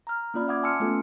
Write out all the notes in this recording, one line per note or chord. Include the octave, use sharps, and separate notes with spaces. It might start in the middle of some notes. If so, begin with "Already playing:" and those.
A#5 F6
A#3 C#4 F4 D5 B5 F6
E5 F#5 D6 D#6 G#6
G#5 A5 C6 E6 F6 C#7
A3 B3 C#4 F4 A4